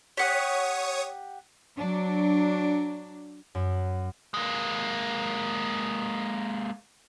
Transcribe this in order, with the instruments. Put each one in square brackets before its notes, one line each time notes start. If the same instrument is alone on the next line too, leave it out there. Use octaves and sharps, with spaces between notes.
[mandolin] G4 F#5 [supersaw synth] C#5 C#6 D#6
[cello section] F#3 D4
[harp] F#2
[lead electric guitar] G#3 A#3